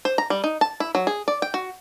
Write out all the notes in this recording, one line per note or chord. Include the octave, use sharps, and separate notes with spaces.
C5
A#5
G3
D#4
A5
E4
F#3
G#4
D5
G5
F#4